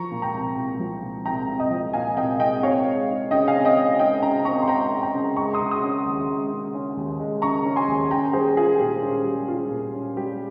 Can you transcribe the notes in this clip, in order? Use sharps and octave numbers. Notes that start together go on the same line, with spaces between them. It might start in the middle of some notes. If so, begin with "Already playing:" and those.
Already playing: F3 A#5 C#6
A#2
G5 A#5
C2
C2
F3
A#2
C2 G5 A#5
C2
D#5 G5
F3
A#2 F5 G#5
C2 D#5 G5
C2 D#5 G5
C4 C#5 F5
G#3
D#4
C#3 D#5 G5
F5 G#5
C4
D#5 G5
G#3
D#4 D#5 G5
C#3 G5 A#5
C4 A#5 C#6
C6
G#3 G5 A#5
D#4
G5 A#5
C#3
G#3 A#5 C#6
C6 D#6
C#3
C6 D#6
C#4
D#2
G#3
C#3
C#4
D#2
G#3
C#3 A#5 C#6
C#4
G#5 C6
D#2
C#4 G5 A#5
G3 G#4 C5
F4 G#4
A#2 G4
C#4
G3
F4
A#2
C#4
G3 G4